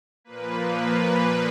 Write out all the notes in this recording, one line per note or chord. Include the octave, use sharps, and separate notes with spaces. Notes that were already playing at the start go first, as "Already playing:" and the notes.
A#2 F3 A#3 B4
B4